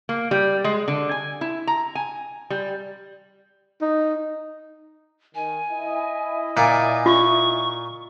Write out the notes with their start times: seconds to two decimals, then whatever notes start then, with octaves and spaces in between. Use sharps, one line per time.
0.09 A#3
0.31 G3
0.64 G#3
0.88 D3
1.11 G#5
1.41 E4
1.67 A#5
1.95 G#5
2.50 G3
3.81 D#4
5.35 D#3 G#5
5.70 E4 D#5
6.57 A#2 D5 G#5
7.06 F4 C#6